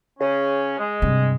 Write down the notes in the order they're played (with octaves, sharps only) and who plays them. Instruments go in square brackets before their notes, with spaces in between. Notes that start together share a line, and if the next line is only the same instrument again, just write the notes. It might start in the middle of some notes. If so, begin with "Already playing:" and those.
[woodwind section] C#3 C#4
G#3
[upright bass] G2 C3